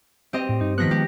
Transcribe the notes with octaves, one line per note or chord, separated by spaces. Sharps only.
C4 G4 D#5
A2
G2 D#4
D#3 F3 B3 F#6 A#6 B6
G#3 G4